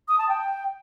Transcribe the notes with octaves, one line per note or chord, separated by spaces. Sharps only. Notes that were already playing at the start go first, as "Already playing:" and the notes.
D#6
A5
G5